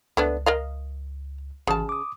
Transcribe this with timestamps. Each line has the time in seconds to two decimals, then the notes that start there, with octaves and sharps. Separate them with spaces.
0.17 C#2 A3 B3 D4
0.46 A#4 D#5 F5
1.67 G#1 C#3 E3 A5
1.89 D6 D#6